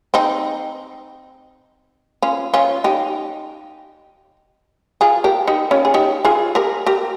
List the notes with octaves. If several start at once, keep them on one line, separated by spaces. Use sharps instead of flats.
C4 D#4
C#4 F4
C#4 F4
D#4 G4
F4 G#4
G4 A#4
D#4 G4
C#4 F4
G#4
D#4 G4
F4 G#4
G4 A#4
G4 A#4